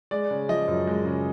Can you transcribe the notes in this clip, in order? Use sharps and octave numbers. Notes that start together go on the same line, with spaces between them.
G#3 D5
C#3
F3 D#5
F#2
G#3
C#3